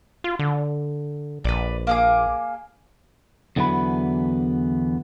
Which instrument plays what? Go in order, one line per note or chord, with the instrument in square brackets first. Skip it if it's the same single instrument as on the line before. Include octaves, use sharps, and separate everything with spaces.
[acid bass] F4
D3
[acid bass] A#1 [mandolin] B4 D5
[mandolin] A#3 G#4 D6
[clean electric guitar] E2 D3 E3 F#3 B3 B5